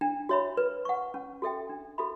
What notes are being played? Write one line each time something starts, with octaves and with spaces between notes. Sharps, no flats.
D4
F#4 C#5 E5 B5
B4
F#5 C#6
C#4
F#4 A4 E5 G5
D4
F#4 A4 E5 B5